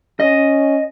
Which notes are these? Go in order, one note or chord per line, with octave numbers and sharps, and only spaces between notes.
C#4 D#5